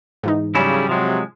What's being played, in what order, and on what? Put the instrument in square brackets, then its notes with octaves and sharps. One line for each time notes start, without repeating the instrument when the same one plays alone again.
[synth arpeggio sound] G#2 E3 D#4
[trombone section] C#3 G3 [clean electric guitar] F#3 C#4 E4
[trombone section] C3 F#3 [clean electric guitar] F3 G#3